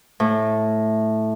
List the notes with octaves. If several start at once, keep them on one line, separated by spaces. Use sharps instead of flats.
A2